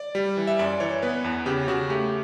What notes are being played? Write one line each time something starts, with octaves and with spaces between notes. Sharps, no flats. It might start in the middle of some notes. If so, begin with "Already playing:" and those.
Already playing: D5
G3
E3
E5
F#2 D5
E3 C#5
B3 B4
E2
C#3 G4
C#3 F#4
A3 G4